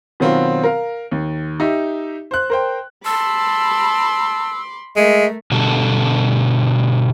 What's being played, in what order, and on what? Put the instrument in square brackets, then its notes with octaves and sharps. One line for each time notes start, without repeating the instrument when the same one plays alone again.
[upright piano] B2 D#3 F#3 C4 F4
A#4 F5
D#2
D#4 G4 E5
C5 F#6
A#4 C5 G5
[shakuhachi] A5 [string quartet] B5 C6 D6 [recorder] E6
[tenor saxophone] G#3 [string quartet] A3 A#4 [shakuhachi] E5
[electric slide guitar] B2 D3 G3 A4